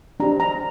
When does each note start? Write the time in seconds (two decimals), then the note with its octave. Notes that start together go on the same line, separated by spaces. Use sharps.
0.20 D4 G4 C5 A#5
0.40 A#5